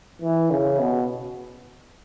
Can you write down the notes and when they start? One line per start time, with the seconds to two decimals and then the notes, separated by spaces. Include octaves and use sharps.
0.22 E3
0.50 C#3
0.79 B2